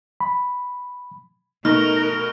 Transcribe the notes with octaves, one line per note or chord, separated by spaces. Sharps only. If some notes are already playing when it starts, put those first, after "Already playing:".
B5
B2 A3 D#4 A#4 F6